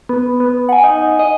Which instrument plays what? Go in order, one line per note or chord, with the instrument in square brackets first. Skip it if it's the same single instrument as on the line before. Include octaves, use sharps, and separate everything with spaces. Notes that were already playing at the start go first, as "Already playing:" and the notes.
[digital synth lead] B3
B3
[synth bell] F#5 G#5
[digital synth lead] D#4
D#5